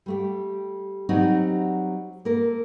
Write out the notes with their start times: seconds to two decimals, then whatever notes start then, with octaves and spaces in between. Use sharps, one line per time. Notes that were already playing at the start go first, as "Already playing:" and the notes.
0.06 G3 A3 G4
1.09 F#3 G3 C4 D#4 F#4
2.25 A#3 A4 A#4